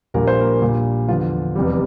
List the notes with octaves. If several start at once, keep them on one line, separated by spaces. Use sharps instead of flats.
A#1 A#2 G3 A#4
C5
A#3 A#4
A#1 A#2 G3
E2 D3 F3 F4
F1 E2 C3 G3